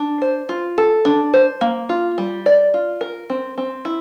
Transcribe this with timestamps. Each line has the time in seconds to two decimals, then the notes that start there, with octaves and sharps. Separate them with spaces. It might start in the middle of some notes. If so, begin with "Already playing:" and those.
Already playing: D4
0.22 C5
0.49 F4
0.78 A4
1.05 D4
1.34 C5
1.61 A#3
1.89 F4
2.18 G3
2.46 D5
2.74 F4
3.01 A#4
3.30 C4
3.58 C4
3.85 E4